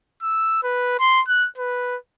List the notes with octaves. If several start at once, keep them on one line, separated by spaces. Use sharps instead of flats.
E6
B4
C6
F#6
B4